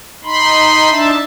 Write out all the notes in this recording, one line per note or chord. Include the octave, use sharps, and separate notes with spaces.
D#4 B5 C6
D4 D#4 E5 A5